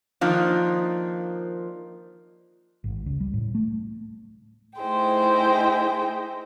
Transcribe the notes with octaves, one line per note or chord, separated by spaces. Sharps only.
D#3 F3 A#3 D4
G#1
C#2
G3
A2
A3
A3 D#4 E4 G#4 C5 G5